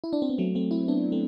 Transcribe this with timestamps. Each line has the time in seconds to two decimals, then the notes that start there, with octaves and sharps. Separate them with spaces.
0.04 E4
0.13 D4
0.22 C4
0.30 B3
0.38 F#3 A3
0.55 A3 C4
0.71 C4 E4
0.88 B3 D4
1.12 A3 C4